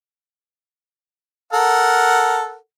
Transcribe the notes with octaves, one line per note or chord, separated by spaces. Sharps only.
A4 A#4 F#5